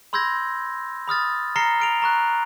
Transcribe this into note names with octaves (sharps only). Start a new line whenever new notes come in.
B5 C6 E6 G6 G#6 A#6
B5 D#6 F6 A6
A#5 F6 A#6 C7 C#7 G7
F6 D7 F7
A#5 C#6 F#6